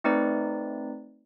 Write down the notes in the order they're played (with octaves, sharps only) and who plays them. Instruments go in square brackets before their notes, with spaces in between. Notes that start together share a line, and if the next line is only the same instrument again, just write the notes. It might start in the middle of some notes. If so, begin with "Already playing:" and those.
[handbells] A3 C4 D#4 B4 D5